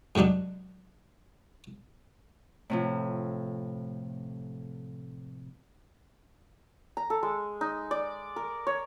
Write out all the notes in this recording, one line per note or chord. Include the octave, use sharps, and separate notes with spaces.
G#2 C3 F#3 D4 D#4
A2 C3 F3
A#5
A4
G#3
D#4
D5
A#4
C#5